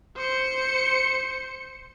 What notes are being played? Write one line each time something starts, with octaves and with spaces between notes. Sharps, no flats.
C5 C#7